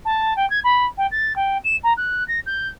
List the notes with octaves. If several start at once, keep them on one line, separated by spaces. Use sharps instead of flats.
A5
G5
G#6
B5
G5
A6
G5
E7
A#5
F#6
A#6
G6